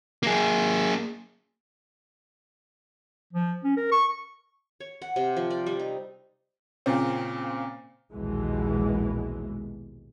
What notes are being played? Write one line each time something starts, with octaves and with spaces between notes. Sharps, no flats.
A#3 G#4
F3
C#4
A#4
C#6
C#5
F#5
C3
F3
D5
G3
D#4
A#2 C#3 C4
A#1 D#2 B2 E3 G#3